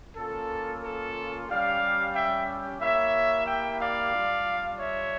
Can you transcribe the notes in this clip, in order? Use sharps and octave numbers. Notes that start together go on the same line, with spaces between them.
A#3 C#4 F4 A4
A4
G3 C#4 G4 D5 F5
E5 G5
A#3 E4 G4 C#5 E5
E5 G5
D5 F5
G3 D4 F4
C#5 E5